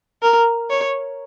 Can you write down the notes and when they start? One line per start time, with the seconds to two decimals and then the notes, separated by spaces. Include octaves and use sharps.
0.22 A#4
0.70 C#5